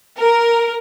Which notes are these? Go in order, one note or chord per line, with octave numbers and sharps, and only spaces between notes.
A#4